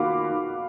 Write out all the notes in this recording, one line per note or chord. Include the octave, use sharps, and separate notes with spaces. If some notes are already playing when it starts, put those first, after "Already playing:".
Already playing: D#3 A#3 F4 F#4 F5 B5 D6